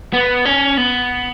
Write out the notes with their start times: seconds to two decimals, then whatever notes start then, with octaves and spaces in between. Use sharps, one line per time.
0.13 B3
0.45 C#4
0.77 B3